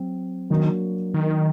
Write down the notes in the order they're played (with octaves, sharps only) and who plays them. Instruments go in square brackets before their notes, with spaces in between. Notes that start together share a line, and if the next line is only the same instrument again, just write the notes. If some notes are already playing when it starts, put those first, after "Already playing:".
Already playing: [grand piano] F#3 C4
[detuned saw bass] D#3 [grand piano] F#3 A#3 D4 F#4
[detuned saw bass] D#3